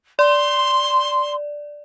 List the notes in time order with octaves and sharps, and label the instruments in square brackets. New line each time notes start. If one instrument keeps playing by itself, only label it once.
[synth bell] D5 [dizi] C6